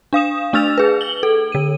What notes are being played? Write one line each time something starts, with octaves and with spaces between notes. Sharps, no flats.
D4 F5 D#6 E7
A3 D4 E6 F6 A6 F7
G#4 B4
F#7 G7
A4
D3 D#7